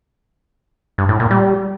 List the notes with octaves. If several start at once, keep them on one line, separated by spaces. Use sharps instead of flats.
G2
A2
A#2
G3